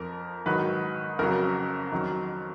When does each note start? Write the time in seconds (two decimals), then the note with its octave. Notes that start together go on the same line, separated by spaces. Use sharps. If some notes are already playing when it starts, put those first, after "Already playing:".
Already playing: F2 F3 A#4
0.46 G#2 D#3 F#3 B4
1.19 F2 C#3 F#3 A#4
1.92 F2 D#3 F#3